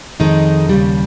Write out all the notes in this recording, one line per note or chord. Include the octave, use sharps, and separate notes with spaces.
F2 D#3 G#3 D#4
D#2 C#3 G3